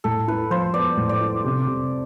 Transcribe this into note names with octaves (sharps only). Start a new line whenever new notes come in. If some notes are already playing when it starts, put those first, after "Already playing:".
A2 A4
E4 B4
F3 C5
B3 D5
A2
D5
E4
C3
C3